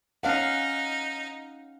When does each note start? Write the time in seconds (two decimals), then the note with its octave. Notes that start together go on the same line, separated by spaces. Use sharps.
0.23 C#4 D#4 F5 F#5